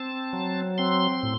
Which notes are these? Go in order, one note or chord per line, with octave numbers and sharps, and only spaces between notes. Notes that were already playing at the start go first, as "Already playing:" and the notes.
Already playing: C4 A5
F#3
C4 C6
A2